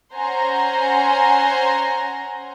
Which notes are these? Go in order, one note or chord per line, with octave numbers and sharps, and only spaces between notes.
C#4 C5 F#5 G#5 A#5 C6